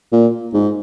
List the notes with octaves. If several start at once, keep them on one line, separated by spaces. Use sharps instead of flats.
A#2
G#2